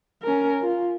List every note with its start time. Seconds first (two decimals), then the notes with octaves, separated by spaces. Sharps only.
0.23 C#4 A#4
0.62 F4